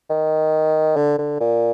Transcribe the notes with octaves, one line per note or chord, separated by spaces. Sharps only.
D#3
D3
D3
A#2